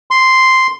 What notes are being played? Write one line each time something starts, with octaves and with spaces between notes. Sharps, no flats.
C6